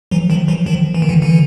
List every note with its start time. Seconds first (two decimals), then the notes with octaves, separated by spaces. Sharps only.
0.11 E3 F#3
0.30 D#3 F3
0.48 E3 F#3
0.66 D#3 F3
0.95 E3
1.02 D#3
1.09 D3 E3
1.22 D3 E3